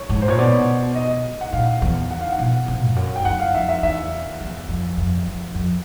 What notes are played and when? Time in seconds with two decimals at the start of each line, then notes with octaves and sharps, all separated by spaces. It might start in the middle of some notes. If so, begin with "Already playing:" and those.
Already playing: C#5
0.09 G#2
0.22 C5
0.28 A#2 C#5
0.39 B2 D5
0.95 D#5
1.41 F#5
1.53 A#2 F5
1.82 E2
2.11 F#5
2.21 F5
2.32 F#5
2.39 B2
2.68 C3
2.87 F2
2.96 F#2
3.16 G5
3.25 F#2 F#5
3.39 F5
3.54 F2 E5
3.69 E5
3.82 E2 E5
4.40 E2
4.68 F2
4.97 F2
5.26 F2
5.55 F2